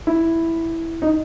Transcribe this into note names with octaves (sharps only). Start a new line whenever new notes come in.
E4
D#4